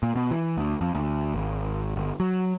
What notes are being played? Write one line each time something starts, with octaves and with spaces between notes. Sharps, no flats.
A#2
B2
E3
D2
F2
D2
G#1
G1
F#3